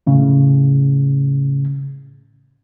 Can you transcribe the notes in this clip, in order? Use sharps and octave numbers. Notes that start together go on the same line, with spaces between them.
A2 C#3